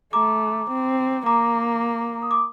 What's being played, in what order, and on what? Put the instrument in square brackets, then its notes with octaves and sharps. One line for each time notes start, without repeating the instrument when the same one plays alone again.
[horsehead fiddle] A3 [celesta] A#5 D6
[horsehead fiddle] C4
[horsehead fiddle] A#3 [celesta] A#5 D6
[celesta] D#6
D6